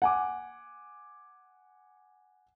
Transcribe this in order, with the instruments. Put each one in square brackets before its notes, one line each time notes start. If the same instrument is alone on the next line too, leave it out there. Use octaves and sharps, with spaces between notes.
[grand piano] F#5 G#5 D6